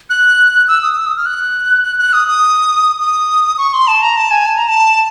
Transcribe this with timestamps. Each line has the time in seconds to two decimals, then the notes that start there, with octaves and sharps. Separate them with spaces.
0.10 F#6
0.68 E6
0.83 D#6
0.97 E6
1.06 D#6
1.17 F6
1.26 F#6
1.84 F#6
1.98 F#6
2.13 D#6
2.28 D#6
3.00 D#6
3.58 C#6
3.73 C6
3.88 A5
4.02 A#5
4.17 A5
4.31 G#5
4.46 A5
4.57 A#5
4.68 A5